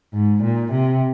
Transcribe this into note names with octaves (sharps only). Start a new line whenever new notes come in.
G#2
A#2
C3